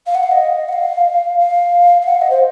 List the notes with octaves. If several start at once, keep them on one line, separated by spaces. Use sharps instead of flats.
F5
F#5
F5
D#5
F#5
F5
F5
F5
F#5
F5
D#5
C5